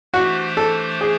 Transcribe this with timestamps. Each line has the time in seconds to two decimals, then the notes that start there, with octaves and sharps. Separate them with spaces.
0.13 E3 A3 D4 F#4 G4 C5
0.57 A4
1.01 G#4